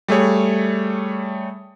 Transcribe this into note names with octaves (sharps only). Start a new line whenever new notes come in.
G3 A3 G#4 C#5